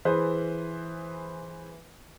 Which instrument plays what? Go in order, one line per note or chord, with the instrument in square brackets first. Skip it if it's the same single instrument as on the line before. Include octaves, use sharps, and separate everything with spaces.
[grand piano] E3 G#4 B4 C5